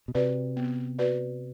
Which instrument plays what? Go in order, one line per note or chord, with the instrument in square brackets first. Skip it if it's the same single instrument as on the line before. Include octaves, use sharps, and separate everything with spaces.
[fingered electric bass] B2
[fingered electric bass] C3 [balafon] F#4 B4 D5
[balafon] B3
F#4 B4 D5